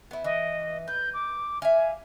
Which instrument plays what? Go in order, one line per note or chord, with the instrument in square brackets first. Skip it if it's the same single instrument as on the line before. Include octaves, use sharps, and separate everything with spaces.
[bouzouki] B3 E4
[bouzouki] E3 [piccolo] D#5
[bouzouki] B4 [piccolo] G6
[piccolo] D6
[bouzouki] E5 F5 [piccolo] G#5